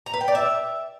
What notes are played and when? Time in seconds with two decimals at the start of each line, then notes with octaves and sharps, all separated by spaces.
0.06 A#5
0.14 B4
0.21 G5
0.28 D5
0.35 E5